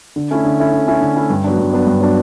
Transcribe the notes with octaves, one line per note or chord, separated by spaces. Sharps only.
D3
A3 C#4 E4
D3
A3 C#4 E4
D3
A3 C#4 E4
D3
A3 C#4 E4
G2
F#3 B3 D4
G2
F#3 B3 D4
G2
F#3 B3 D4